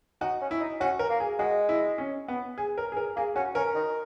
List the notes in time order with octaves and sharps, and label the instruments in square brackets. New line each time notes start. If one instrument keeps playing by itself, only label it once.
[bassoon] D#4 [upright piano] F#4
[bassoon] C#4
[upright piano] E4
[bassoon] D#4
[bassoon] C#4 [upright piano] F#4
[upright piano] A#4
[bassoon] A#3
[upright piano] G#4
[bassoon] G#3 [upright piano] F#4
[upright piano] E4
C#4
B3
G#4
A#4
G#4
A#4
[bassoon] A#3 [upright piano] G#4
[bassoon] C#4 [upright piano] F#4
[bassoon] C#4 [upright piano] A#4
[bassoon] D#3